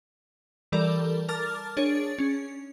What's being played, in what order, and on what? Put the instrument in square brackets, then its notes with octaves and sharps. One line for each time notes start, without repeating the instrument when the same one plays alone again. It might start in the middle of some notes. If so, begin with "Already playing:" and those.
[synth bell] E3 G3 A4 A#4 D5
A#4 A5 D6 F6 A6
D4 G#4 C#5 A6 D7
C#4